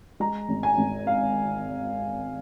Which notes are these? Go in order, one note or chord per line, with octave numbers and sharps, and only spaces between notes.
G#3 A#5
G#1
G#5
G#1
F5